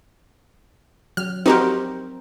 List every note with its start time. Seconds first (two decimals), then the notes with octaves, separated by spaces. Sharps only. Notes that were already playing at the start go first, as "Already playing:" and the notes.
1.17 F#3 F6
1.46 C4 D#4 F#4 G4 A#4 C5